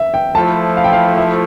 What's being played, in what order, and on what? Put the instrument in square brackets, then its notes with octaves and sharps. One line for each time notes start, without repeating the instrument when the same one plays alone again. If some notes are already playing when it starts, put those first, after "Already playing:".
Already playing: [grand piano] E5
G5
[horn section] F3 A3 E4 [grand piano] A5
[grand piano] F5
G5
F5
E5